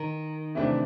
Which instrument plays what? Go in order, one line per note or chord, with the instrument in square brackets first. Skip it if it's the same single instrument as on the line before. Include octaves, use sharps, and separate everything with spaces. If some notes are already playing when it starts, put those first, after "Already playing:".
Already playing: [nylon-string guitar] D#3
[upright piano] C3 E3 A3 D4